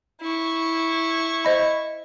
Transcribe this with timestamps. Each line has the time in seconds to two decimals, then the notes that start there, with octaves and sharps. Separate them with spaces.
0.22 E4 C#6
1.45 C5 D#5 B5